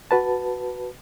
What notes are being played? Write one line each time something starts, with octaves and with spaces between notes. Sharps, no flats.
F#4 B4 A5